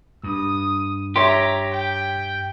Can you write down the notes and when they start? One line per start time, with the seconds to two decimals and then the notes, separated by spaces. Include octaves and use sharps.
0.24 G2 D#6
1.16 G4 C#5 E5 A#5 C6
1.73 G5